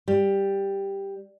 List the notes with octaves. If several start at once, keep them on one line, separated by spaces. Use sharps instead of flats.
G3